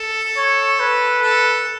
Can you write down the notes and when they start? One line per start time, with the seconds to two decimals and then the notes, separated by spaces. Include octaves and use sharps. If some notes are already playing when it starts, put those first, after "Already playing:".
Already playing: A4
0.37 C#5
0.80 B4
1.22 A4